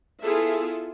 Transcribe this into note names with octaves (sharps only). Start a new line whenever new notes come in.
B3 E4 F4 G#4 A4 E5